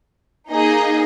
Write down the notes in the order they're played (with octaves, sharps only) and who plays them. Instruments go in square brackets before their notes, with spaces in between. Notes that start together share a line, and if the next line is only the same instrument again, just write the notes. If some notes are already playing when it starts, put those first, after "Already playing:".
[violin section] A#3 D#4 G#4 D#5